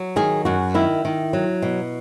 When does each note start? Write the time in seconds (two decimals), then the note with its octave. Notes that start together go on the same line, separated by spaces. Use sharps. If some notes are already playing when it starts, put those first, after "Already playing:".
Already playing: F#3
0.16 D#3 G#4
0.45 F#2 F#4
0.74 D#3 E4
1.05 D#3
1.33 F#3
1.62 B2